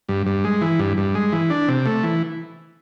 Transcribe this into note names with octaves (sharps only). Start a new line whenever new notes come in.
G2
G2
G#3
E3
G2
G2
G#3
E3
D4
C3
A3
E3